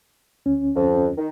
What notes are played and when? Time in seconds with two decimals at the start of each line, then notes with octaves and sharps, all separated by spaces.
0.46 D2 C#4
0.76 F2
1.18 D#3